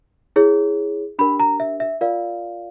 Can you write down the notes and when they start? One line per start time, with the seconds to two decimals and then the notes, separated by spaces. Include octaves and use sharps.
0.36 E4 G#4 C#5
1.19 D4 G4 A#4 B5
1.40 A#5
1.60 E5
1.80 E5
2.01 F4 A#4 D5 F5